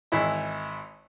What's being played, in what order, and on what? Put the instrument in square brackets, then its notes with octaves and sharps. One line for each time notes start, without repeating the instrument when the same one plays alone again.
[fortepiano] G#1 E3 E4 E5